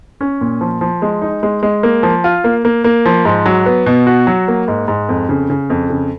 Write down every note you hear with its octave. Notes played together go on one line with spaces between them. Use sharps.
C#4
A#2
F3
F3
G#3
D#4
G#3
G#3
A#3
F3
F4
A#3
A#3
A#3
F3
G#2
F#3
B3
B2
F#4
F#3
A#3
G#2
G#2
F2
C#3
C#3
F2
C#3